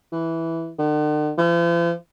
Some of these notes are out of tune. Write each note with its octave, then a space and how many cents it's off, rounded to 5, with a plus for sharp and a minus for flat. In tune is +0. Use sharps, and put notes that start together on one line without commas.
E3 -5
D3 +45
F3 -45